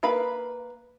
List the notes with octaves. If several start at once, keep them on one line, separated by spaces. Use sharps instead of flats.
A#3 B4 F5 B5